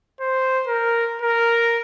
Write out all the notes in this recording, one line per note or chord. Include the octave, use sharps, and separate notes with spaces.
C5
A#4
A#4